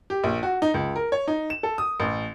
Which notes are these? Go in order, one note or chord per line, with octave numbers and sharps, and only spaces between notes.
G4
A#1
F#4
D#4
C#2
A#4
C#5
D#4
E7
A4
D#6
A1